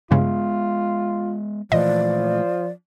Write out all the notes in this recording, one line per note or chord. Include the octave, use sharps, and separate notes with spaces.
G2 C#3 G#3 B3 F4
A#2 E3 F3 A3 D5 D#5